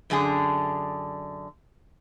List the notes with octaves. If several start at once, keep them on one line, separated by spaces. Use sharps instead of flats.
F#2 D3 D4 G#4